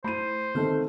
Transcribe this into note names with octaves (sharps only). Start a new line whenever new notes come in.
A3 E4 C5 B5 D#7
D3 D#3 A3 C4 F6